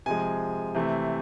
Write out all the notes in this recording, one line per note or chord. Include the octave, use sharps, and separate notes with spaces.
C3 F3 G#3 G#5
C3 E3 A3